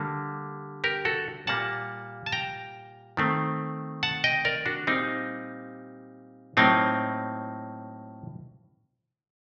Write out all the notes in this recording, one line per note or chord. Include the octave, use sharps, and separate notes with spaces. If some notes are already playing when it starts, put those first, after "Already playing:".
Already playing: D3 G3 A#3
G4 A#4
F#4 A4
A#2 G3 A#3 F#5 A5
A5
G5 A#5
D#3 A3 C4
F#5 A5
D#5 G5
A#4 D5
D4 F#4
A#2 G3 A#3 C4 D#4
A2 F#3 A#3 C4 D#4